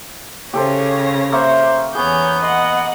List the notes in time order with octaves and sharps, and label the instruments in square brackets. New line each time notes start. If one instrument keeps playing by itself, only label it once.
[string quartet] C#3 C#5 A#6 [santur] G4 A4 C5
[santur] A#3 E5 C#6 [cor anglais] C5
[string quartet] E2 C#5 G6 [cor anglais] B3 [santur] C#4 G#4
[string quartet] D#5 F#5 [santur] C6